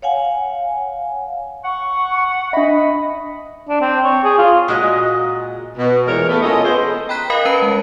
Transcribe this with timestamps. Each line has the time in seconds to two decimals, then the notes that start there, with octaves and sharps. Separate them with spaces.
0.02 C#5 F5 F#5 G#5
1.64 F#5 C#6
2.53 D4 D#5 E5 B5
3.69 D4
3.81 C4
4.04 C#5
4.24 G#4
4.38 F4
4.68 A#2 G#3 F#4 D#5
5.77 B2
6.07 E2 A#2 E3 G#3 A#4 C#5
6.29 A3 B3
6.42 G#3 C#4 F4 A4 D#5
6.63 G#3 B3 C5
7.09 G5 A#5 B5 F#6 B6
7.30 A#4 D#5 F5 B5
7.45 C#4 B4 A5 C7 D#7
7.62 G#3